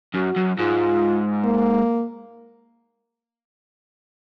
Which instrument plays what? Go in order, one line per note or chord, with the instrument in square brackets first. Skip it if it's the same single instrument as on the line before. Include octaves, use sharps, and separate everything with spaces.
[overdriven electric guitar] F#2 [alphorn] F#4
[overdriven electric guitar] F#2
[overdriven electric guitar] G#2 [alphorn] F4
[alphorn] A#3